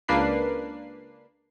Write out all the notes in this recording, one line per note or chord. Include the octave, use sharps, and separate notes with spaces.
C#2 A#3 D4 B4 C7